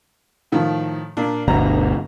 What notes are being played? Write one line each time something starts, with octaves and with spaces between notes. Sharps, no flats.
A2 D#3 F3
A#2 A#3 D4
G1 D2 B2 A#5